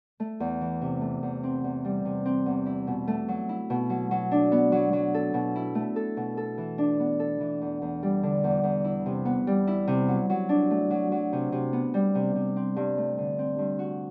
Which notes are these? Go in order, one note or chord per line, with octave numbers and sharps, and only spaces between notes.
A3
E2
E3
C3
A3
E2
C4
E2
G3
C3
C4
E2
E4
B2
A3
F#3
E4
B2
F#3
F#3
D4
B3
F#3
F#3
A4
B2
E4
A3
A4
B2
A4
E3
D4
B3
A4
E3
E2
E2
G3
D3
E2
E2
E4
C3
B3
G3
E4
C3
F#3
F#3
D4
A3
F#3
F#3
C3
C3
B3
G3
C3
C3
C4
G2
A3
D3
C4
G2
F#4